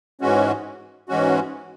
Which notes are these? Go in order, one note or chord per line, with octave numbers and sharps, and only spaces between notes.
G#2 E3 G#3 C#4 F#4
G#2 E3 G#3 C#4 F#4